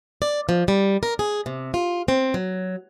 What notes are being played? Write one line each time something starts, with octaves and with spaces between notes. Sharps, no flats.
D5
F3
G3
A#4
G#4
C3
F4
C4
F#3